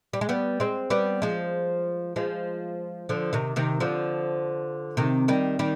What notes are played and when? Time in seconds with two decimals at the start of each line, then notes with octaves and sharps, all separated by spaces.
0.13 G3
0.21 G#3
0.29 G3 B3
0.60 G#3 C4
0.90 G3 B3
1.22 F3 G#3
2.16 F3 G#3
3.09 D3 F3
3.33 C3 D#3
3.56 C3 D#3
3.80 D3 F3
4.97 C3 D#3
5.28 D#3 G3
5.59 D#3 G3